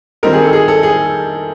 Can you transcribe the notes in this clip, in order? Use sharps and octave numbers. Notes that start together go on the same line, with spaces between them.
D#3 G3 C4 D#4 A#4
G#4
A4
G#4
A4
G#4